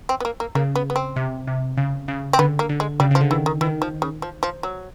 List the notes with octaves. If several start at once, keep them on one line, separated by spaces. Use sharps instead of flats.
C4
B3
A#3
A#3
C#3 A#3
B3
B3
C4
C3
C3
C#3
C#3
C4
D3 B3
A#3
D3
G#3
C#3 G3
C#3 F3
D3
D#3 E3
D#3
D#3 E3
F3
C#3
F3
F3
F#3